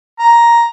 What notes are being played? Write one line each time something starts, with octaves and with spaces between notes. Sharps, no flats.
A#5